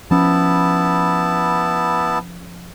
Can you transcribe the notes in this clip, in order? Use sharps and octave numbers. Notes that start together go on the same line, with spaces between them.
F3 B3 C#4 E4 A5